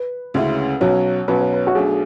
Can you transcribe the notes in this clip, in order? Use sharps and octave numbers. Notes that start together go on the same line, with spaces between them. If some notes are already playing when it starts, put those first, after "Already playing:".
Already playing: B4
D2 C#3 G#3 C#4 E4
B1 B2 F#3 C#4 F#4 C#5
B1 B2 F#3 C#4 F#4 B4
C#5
B4
F#4
B1 B2 A3 D4 G#4